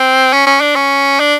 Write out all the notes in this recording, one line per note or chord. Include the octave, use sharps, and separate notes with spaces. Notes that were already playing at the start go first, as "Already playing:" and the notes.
Already playing: C4
C#4
C#4
D4
C#4
D4